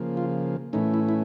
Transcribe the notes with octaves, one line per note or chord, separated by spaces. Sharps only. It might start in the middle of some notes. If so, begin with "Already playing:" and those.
Already playing: C#3 F3 A#3
F4
A2 E3 A3 C#4 D#4
E4
E4